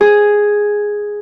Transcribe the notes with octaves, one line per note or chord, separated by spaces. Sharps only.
G#4